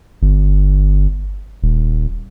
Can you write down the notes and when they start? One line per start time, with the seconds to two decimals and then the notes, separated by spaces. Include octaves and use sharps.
0.22 G1
1.62 D#1